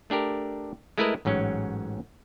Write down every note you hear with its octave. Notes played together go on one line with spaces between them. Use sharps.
A3 D4 G4 A#4
G#3 A3 E4 A#4 B4 D#5
A1 G#2 F#3 C#4